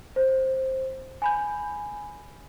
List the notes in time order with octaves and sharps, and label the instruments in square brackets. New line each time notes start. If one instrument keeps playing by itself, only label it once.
[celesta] C5
G#5 B5 G6